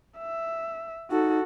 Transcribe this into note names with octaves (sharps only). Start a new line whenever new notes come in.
E5
D#4 F#4 A4